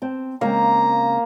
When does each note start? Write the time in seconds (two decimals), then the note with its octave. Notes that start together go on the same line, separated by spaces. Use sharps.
0.02 C4 A5
0.41 C#3 G#3 A#3 C4 F5 A#5